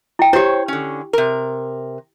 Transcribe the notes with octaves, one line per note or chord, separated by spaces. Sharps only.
E4 G5
E4 G4 C5 C#5
D3 C#4
C3 A#4